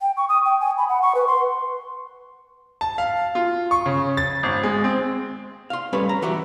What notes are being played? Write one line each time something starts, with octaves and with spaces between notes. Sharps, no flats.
G5
C#6
D#6
G5
G#5
B5
F#5
C#6
B4
C6
A5
F5
F4
C#6
C#3
A6
G#1
G#3
C4
F5 C6
G3 A3 C#4 B4 C#5
A#5
E3 F#4 G4 B4 E5